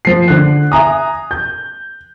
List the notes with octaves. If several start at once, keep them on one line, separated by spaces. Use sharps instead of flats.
F3 C7
D3 F#6
E5 G#5 A#5 D#6
G6